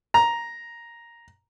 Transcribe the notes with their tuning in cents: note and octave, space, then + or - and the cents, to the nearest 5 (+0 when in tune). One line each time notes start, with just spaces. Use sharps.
A#5 +5